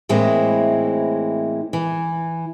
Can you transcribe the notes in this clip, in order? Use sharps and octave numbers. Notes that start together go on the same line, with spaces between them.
A2 E3 G#3 A#3 C4 E4
E3